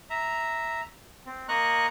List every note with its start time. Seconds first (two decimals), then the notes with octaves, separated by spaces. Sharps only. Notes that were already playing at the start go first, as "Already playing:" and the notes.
0.10 E5 A#5
1.26 C4
1.49 A#3 D#5 A#5 C#6 F#6